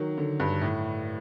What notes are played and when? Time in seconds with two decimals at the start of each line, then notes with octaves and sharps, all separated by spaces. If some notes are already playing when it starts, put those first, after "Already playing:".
Already playing: D#3 F#3
0.18 D3
0.40 G2
0.62 A2